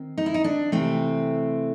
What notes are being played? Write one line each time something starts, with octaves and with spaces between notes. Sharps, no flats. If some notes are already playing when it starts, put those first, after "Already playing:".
Already playing: D#3 C4
D#4
E4
D#4
D4
C3 E3 A3 C4